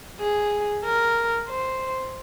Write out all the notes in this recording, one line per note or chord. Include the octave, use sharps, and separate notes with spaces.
G#4
A#4
C5